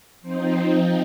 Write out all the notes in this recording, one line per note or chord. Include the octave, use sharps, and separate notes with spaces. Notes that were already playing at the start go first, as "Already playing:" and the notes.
F3 C4 D#4 C5